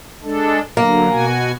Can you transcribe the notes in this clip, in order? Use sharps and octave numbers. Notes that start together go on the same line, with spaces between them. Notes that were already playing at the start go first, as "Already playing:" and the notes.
G#3 D4 A4
D3 F#3 A#3
B2 F#4 G#5